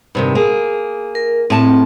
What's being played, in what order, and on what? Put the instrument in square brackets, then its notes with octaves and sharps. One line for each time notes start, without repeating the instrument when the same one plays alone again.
[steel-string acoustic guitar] G2 C3 D#3
A#3 G#4
[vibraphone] A#4
[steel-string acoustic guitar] A2 A5 [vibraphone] C4